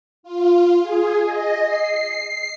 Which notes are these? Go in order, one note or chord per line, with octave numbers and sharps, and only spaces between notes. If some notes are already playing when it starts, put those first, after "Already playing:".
F4
G#4
D#5
C7